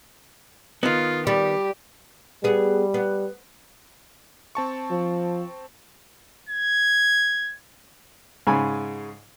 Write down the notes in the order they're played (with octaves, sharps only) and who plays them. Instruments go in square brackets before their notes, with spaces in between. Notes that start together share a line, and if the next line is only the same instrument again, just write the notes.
[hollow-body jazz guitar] D#3 B3 [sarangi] F4
[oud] G3 [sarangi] G4
[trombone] G3 [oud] B3 G#4
[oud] B3
[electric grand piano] C4 A5 C#6
[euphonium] F3
[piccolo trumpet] G#6
[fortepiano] G#2 C#3 G#5 B5